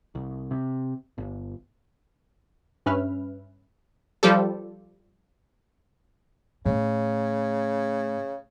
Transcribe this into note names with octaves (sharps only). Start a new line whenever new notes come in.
C2
C3
G1
G2 C#4 B4 E5 F6
F3 G3 G4 A4
A2 C#3